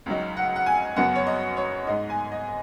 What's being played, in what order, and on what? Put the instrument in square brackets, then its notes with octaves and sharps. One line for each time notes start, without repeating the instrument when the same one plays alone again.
[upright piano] C#2 C#3 F#3 D#4
F#5
F#5
G#5
F#2 C#3 F#3 B3 F#5
C#5
D#5
C#5
G#2 G#3 D#4 D#5
G#5
D#5